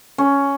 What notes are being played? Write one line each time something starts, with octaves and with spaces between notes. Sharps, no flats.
C#4